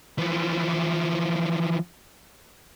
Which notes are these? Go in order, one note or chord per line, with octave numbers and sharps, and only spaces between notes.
E3 F3